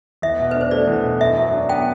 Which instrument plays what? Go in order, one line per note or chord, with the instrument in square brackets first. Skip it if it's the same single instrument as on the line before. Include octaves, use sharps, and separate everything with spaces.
[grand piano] E2 [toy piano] E5
[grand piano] B2
[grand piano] D4 [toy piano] B4
[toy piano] C5
[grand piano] A3 [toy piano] D5
[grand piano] E2
B2
[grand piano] F#2 [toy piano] E5
[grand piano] F#3
D4
[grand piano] B3 [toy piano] G5